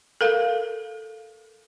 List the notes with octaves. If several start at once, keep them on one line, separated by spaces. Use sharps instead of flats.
A4 A#4 F5